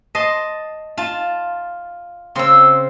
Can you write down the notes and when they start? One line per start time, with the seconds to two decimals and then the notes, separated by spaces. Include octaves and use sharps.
0.15 D#5 A5 C6
0.97 F4 A5
2.35 C#3 C4 C6 E6